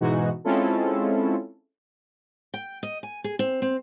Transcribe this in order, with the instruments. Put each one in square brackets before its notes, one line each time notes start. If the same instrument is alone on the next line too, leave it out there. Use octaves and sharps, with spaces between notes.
[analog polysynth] G#2 B2 E3 G#3 D#4 F#4
G#3 C4 C#4 E4 F4 A4
[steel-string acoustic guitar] G5
D#5
G#5
G#4
C4
C4